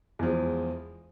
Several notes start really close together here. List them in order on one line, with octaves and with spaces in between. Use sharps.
E2 F3 G#3